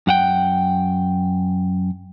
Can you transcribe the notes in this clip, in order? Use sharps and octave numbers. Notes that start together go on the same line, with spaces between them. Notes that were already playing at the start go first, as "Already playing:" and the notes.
F#2 F#5 G5